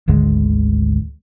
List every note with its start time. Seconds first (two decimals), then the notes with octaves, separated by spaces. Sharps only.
0.08 G#1 D2 D3 G#3